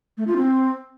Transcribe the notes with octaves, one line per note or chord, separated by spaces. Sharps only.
A3
F4
C4